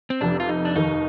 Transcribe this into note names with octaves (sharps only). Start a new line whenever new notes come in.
C4
F1 F2 C3 D4
F4
D#4
D4
F1 D#2 D#3 D#4